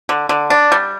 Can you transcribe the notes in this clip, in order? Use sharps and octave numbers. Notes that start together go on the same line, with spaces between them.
D3
D3
D4
G3